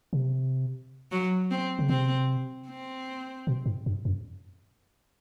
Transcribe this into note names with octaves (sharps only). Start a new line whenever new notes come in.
C3
F#3
C4
C#3
C3 C4
C4
B2
G#2
G2
F#2